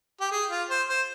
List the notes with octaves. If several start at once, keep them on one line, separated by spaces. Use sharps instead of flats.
G4
G#4
F4
C5
C5